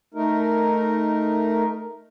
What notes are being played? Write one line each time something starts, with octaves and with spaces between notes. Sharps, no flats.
A3 D#4 A#4